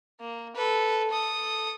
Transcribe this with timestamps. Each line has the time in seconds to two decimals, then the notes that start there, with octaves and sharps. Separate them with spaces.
0.21 A#3
0.56 A4 B4
1.11 A4 D#6